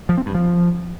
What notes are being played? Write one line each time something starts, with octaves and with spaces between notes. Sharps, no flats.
F3
C4
G2
F3